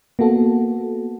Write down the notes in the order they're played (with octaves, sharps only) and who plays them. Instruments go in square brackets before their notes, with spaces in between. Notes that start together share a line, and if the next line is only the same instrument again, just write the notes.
[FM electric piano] A#3 B3 F#4 A4